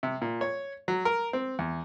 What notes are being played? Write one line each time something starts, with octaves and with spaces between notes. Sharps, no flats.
C3
A#2
C#5
F#3
A#4
C4
E2